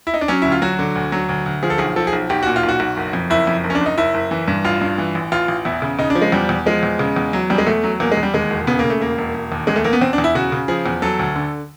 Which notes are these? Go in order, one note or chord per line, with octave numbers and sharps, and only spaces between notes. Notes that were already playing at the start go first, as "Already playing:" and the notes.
E4
D#4
D4
F#3 C#4
D2 E4
F4
F#3 F#4
D3
D2
F#3
D2
D2
F3 G#4
A4
B1 G#4
F3 A4
G#4
B1
B1 G4
A#2 F#4
F4
B1
F#4
B1
F#1
F2
F#1 E4
F2
F#1
C#4
D4
F#1
D#4
F#1 E4
F#1
E3
G2
A1 F4
G2
E3
A1
A1 F4
A1
E2 E4
C#3
C#3 D#4
D4
F3
G#3
E2 G3
E2
F3 G#3
E2
C#3
E2
F#3
E2 G3
G#3
E2 A3
F#3
E2 A#3
G#3
E2
G3
D#2 G#3
E1
C#3 B3
A#3
C#3
A3
E1 A#3
E1
E1
D#2
E2 G#3
A3
E2 A#3
B3
E2 C4
D4
E2
E4
C#3 F#4
C#3
F3 G#4
E2
F#3 A4
D2
D3